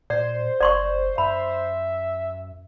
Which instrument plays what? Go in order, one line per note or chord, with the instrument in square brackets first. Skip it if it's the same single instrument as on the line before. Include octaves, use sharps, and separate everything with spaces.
[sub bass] A#2 [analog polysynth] C5 [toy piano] D5
[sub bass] F#1 [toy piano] D5 C6 C#6
[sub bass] F#2 [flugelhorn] E5 [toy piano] B5